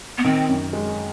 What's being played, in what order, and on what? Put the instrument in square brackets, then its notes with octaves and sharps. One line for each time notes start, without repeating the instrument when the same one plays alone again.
[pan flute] B3
[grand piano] D#3 [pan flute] C4
[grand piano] F#2
G#3